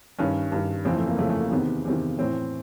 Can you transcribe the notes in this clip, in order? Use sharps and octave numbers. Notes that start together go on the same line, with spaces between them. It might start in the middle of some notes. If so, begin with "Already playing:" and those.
G2 D#3 C#4
G2 D#3
F2 C#3 E3 C4
A3
A#3
F2 C#3 E3 A3
A3
A#3
E2 C3 D#3 B3
E2 C3 D#3
A2 E3 C4